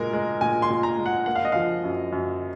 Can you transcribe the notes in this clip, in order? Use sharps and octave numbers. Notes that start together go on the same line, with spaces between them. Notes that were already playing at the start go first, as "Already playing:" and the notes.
Already playing: A#2 G#3 A#4
G#3
A#2 G#5
C6
A#2
A#5
G#3
F#5
A#3 F#5
F5
D#5
F3 F5
F#2
F#2